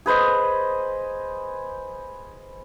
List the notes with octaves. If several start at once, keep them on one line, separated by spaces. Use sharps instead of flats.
G#4 B4 C5 D#5